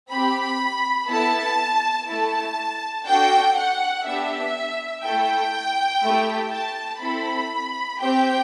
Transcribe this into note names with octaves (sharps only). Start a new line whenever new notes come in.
C4 G4 B5
B3 E4 A4 A5
A3 E4 A4 A5
D4 F#4 A4 G5
F#5
B3 D4 G4 E5
A3 E4 A4 G5
A3 E4 G4
A5
C4 E4 A4 B5
C4 G4 G5